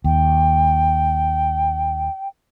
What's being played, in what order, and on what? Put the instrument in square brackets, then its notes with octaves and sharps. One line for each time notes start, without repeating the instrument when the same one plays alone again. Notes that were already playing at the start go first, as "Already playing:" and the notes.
[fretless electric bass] D#2 [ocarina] G5